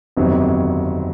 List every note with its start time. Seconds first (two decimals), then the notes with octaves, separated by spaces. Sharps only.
0.17 G1 F2 C3 D#3 F#3